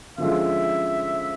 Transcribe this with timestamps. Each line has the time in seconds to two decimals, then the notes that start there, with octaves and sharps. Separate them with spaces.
0.18 D3 F3 G#3 C#4 F4 E5